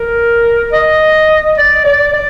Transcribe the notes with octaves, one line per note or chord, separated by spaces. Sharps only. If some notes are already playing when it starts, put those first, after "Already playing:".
Already playing: A#4
D#5
D5
D5
D5